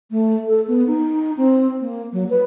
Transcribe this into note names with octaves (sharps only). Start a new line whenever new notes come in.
A3
A4
B3
D#4
C4
A#3
F#3
B4